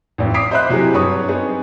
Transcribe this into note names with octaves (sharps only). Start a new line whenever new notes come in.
A1 F2
D6 D#6 B6 C7 D7
C5 D#5 E5 B5 F#6
C3 F#3 E4 G4 G#4
G2 F#3 C#5 C#6 D#6
B3 C4 D#4 G#4